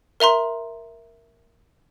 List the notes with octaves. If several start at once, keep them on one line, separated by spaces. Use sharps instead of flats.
A#4 E5 A#5 C6